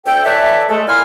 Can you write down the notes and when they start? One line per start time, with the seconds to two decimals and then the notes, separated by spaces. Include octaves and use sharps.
0.05 D2 A4 G5
0.24 E3 A4 B4 C#5 D5 E5
0.68 G#3 A3 A4
0.88 A#2 A#3 E4 G#5 C6 F6